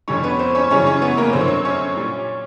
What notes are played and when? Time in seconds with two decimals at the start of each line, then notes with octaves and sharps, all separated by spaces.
0.08 F2 D3 G3 C#4 C#5
0.24 B3 B4
0.39 C4 C5
0.55 C#4 C#5
0.70 F#2 C#3 E3 G3 C#4 C#5
0.87 C#4 C#5
1.02 B3 B4
1.17 A#3 A#4
1.33 F#2 D3 F#3 C5
1.41 C#5
1.48 C4 C5
1.65 C#4 C#5
1.96 A#2 G3